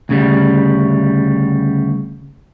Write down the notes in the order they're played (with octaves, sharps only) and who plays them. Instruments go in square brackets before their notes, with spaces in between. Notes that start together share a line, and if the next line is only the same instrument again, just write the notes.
[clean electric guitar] D2 C#3 G3